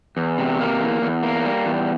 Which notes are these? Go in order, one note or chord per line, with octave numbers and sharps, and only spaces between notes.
E2
C3
A#3
E2
E2
A#3
G3
E2